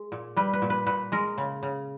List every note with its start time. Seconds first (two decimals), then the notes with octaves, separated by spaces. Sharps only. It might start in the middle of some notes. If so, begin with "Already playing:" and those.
Already playing: G#3
0.12 A#2
0.37 G3 B4
0.53 B4
0.62 A#2
0.70 B4
0.86 A#2 B4
1.12 G#3 A#4
1.38 C#3
1.63 C#3